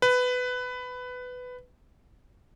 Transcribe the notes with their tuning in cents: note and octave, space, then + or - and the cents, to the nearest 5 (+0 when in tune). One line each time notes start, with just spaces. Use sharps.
B4 +15